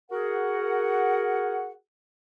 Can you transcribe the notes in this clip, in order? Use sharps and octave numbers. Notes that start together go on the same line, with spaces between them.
F#4 G#4 A#4 F#5